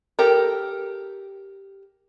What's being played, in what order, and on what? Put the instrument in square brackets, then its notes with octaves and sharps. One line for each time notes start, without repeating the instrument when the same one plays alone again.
[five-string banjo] G4 A4 A#4